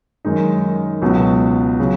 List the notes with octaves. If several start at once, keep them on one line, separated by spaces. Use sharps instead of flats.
F#2 D#3 G#3 D#4
C#2 B2 F#3
C#3 F#3